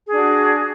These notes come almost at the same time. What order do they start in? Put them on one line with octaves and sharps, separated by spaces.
G#4 D4 F#4